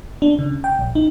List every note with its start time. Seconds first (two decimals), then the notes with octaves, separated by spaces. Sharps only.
0.22 D4
0.39 C#3
0.64 G5
0.79 A#1
0.95 D#4